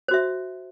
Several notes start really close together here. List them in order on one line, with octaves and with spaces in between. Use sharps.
C5 F#4 E5